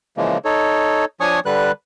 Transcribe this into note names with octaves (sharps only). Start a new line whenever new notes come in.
C#3 E3 F3 G#3 A#3
D#4 A4 C#5
F3 D4 C#5 G#5 C#6 D#6
D3 G3 B4 F#6